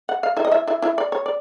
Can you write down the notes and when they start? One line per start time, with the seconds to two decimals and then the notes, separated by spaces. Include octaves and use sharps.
0.09 F#5
0.23 F5
0.37 E4 E5
0.45 D#5
0.51 E4 E5
0.67 E4 E5
0.82 E4 E5
0.98 D5
1.12 C#5
1.26 D5